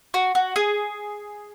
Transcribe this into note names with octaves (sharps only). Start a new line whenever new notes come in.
F#4
F#4
G#4